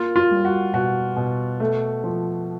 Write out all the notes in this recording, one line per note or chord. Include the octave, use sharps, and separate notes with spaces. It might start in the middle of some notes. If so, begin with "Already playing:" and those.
Already playing: A#3 F4
F4
G3
F#4
B2 F#4
B2
A3
F3